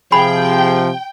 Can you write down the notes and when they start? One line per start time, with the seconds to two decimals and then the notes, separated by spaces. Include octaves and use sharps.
0.12 C3 F3 G#4 G5 B5